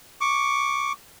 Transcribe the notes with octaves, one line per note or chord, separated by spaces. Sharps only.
C#6 D6